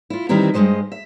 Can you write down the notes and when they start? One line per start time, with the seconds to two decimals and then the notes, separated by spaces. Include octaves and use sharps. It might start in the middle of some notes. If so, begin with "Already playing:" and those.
0.10 E4 F4
0.29 D#3 E3 G3 C4 E4 A#5
0.54 G2 F#3 G#3 C5 D#5
0.92 E5